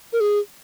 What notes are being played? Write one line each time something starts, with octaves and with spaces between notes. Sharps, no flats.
A#4
G#4